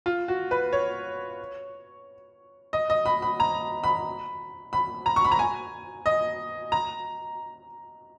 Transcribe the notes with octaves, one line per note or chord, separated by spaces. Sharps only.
F4
F#4
B4
C#5
D#5
D#5
B5
B5
A#5
B5
B5
A#5
C#6
B5
A#5
G#5
D#5
A#5